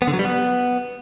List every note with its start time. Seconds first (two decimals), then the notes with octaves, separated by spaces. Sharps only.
0.02 B3
0.08 D3
0.13 F#3
0.19 G3
0.25 B3